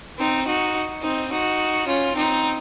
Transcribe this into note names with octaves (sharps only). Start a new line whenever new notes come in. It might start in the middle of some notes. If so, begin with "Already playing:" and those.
C4 D#4
D#4 F#4
C4 D#4
D#4 F#4
C#4 F4
C4 D#4